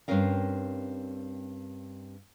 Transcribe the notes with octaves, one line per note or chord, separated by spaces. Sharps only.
G2 C#3 C4 C#4 A#4 F5